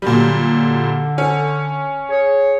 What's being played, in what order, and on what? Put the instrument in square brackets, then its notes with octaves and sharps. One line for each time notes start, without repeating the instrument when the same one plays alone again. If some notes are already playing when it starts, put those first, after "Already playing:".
[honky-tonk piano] A#2 F#3 G3 [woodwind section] D3
[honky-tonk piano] C#4
[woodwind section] G#4 C#5